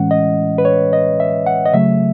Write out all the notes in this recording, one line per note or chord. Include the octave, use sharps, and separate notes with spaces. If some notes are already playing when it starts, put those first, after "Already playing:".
Already playing: A2 E3 G#3 C#4 F#5
D#5
B4
C#5
D#5
E5
F#5
D#5
C#3 F#3 A3 E5